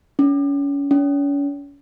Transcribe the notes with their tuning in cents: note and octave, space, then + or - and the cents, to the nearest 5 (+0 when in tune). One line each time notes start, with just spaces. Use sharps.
C#4 +30
C#4 +40